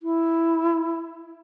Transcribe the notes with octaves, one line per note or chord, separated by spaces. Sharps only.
E4